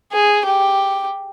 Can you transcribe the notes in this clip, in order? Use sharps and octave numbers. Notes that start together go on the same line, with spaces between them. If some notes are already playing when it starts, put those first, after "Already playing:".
G#4
G4